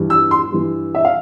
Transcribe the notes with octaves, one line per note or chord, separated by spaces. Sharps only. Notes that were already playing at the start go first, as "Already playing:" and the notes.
Already playing: G2 E3
E6
C6
G2 E3
E5
F5